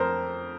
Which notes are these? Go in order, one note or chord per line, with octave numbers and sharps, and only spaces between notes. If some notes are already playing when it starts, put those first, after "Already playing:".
Already playing: F2 A#4 C5